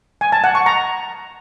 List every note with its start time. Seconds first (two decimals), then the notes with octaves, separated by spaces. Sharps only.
0.21 G#5
0.32 A5
0.44 F#5
0.55 C#6
0.66 A#5